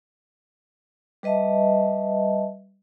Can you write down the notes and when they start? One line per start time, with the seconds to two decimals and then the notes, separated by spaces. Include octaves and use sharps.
1.23 G3 B4 D#5 E5 A5